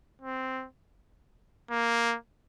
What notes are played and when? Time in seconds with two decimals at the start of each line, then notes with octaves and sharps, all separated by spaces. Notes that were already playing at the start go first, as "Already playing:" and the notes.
0.21 C4
1.71 A#3